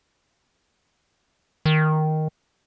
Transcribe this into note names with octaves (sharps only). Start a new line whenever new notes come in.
D#3